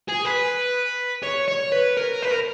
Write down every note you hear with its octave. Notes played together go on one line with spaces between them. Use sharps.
G#4
B4
C#5
C#5
B4
A#4
B4
A#4